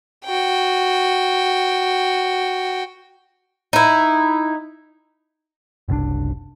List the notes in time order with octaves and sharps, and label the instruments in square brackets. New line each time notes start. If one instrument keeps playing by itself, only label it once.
[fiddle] F#4 G5
[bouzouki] D#4 E4
[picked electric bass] F#1 C2 B2 D4